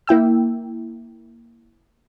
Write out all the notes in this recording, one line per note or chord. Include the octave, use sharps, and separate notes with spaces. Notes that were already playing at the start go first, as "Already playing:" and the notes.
A#3 E4 G5 E6